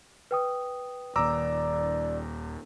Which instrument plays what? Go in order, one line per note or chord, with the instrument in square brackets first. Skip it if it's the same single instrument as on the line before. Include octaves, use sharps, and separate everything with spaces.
[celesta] B4 G5 D#6
[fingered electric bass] D#1 D#2 [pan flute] D5 [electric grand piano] A#5 D6 E6